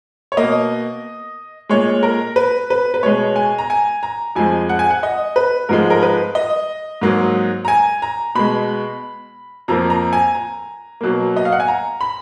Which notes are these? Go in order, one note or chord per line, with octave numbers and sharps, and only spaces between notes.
C#5
B2 A#3 D#5
A#2 G#3 C#5
A#4
B4
B4
B4
B2 G#3 C#5
G#5
A#5
G#5
A#5
F2 F3 G#3 G#5
F#5
G#5
F#5
D#5
B4
G#2 F3 G#3 A#4
A#4
B4
D#5
G#2 F#3 A#3
A#5
G#5
A#5
B2 G#3 B5
F2 F3 A#3 A#5
A#5
G#5
A#5
B2 F#3 A#3
D#5
F5
F#5
G#5
A#5
B5